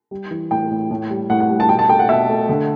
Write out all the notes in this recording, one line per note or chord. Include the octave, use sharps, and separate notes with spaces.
G3
E3
A2 G5
A2
A2
G3
A2 F#5
F#5
G3
A5
B2 G5
A5
A3 G5
F#5
B2 E5
A3
D3